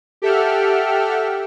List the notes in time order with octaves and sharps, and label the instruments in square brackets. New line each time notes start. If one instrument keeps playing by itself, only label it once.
[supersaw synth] G4 A4 E5 F#5 G5 F6